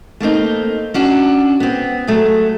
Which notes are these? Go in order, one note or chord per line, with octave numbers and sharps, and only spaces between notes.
A3 A#3 C4 D#4
C#4 D4 F#4
B3 C4
F#3 A3 G#4